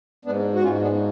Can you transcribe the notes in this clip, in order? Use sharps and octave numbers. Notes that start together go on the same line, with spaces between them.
G#2 B3 D4
F#4
G#2 C#4 F4
B3 D4